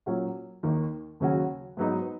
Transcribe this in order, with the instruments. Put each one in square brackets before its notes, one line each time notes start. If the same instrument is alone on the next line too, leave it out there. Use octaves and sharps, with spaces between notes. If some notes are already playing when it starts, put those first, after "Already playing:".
[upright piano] A#2 F#3 C#4 F#4
D#2 D#3 A#3 D#4
D#2 C#3 F#3 C#4 F#4
G#2 F#3 B3 D#4